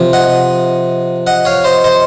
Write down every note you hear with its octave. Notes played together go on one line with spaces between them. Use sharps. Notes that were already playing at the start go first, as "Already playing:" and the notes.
Already playing: C3 F3
D#5 F#5
D#5 F#5
C#5 F5
C5 D#5
C5 D#5